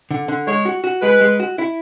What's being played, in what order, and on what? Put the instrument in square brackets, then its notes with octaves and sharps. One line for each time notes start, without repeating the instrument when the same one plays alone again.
[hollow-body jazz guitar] D3
D3
[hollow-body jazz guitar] G#3 [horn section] C#5
[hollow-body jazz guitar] F#4
F#4
[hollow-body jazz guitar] G#3 [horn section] B4
[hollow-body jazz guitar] G#3
F#4
E4